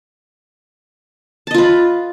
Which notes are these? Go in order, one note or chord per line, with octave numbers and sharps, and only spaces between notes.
F4 B4 D#5 A5